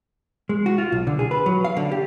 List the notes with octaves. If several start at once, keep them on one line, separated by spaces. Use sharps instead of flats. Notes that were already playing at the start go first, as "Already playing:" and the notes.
G#3
F#4
F4
B1
D3
G#4
B4
F#3
F5
D3
G4